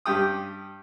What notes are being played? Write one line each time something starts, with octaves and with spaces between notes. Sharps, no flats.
G2 G4 G5 D#6